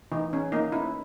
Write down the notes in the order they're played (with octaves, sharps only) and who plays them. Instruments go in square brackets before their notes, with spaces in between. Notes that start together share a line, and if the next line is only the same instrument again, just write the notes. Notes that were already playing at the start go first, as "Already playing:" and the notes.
[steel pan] E3 D#4
C#4
A#3 D#4
C#4 E4